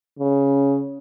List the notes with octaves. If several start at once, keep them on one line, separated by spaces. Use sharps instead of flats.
C#3